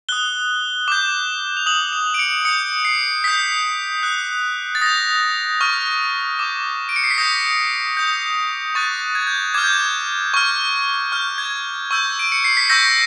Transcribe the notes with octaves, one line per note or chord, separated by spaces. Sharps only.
D#6 F#6 G7
D6 G6
F7
D#6 F#6 F#7
F7
D7
C#7
D#6 G6 C#7
C7
D#6 G6 B6
D#6 F#6
A6
D#6 G6 A#6
C#6 F6
D6 G6
D7
C#7
C7
B6
D#6 G6 A#6
D#6 G6
C#6 F#6 A6
G#6
G6
G#6
D6 F6 G#6
G6
G#6
C#6 F6
C#6 F6 G6
G#6
C#6 E6 G6
D7
C#7
C7
B6
C#6 E6 G6 A#6